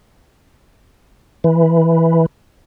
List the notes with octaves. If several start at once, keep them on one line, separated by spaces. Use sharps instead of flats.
E3